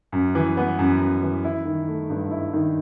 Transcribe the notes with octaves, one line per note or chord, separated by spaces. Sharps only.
F#2
E3
B3
F#2
F#2
E3
E4
D#3
A3
G2
E4
D#3